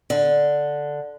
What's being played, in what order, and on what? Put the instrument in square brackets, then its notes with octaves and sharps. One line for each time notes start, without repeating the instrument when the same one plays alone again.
[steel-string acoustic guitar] D3